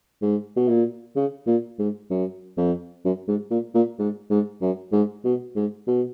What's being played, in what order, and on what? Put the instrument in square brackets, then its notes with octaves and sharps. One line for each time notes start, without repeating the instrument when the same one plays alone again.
[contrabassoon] G#2
B2
A#2
C#3
A#2
G#2
F#2
F2
F#2
G#2
A#2
A#2
G#2
G#2
F#2
G#2
B2
G#2
B2